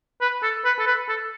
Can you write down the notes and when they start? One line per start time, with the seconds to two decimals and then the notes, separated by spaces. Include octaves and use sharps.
0.21 B4
0.43 A4
0.65 B4
0.79 A4
0.87 B4
1.09 A4